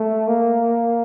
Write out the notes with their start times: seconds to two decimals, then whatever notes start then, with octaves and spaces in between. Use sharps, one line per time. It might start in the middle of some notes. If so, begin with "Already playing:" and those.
Already playing: A3
0.27 A#3